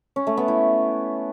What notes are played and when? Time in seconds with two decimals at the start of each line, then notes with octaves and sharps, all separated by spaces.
0.16 C#4
0.27 A3
0.37 B3
0.48 E4